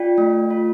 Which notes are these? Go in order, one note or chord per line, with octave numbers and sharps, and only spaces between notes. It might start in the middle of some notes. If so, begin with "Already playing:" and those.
Already playing: F4 D5 G5
A3
F4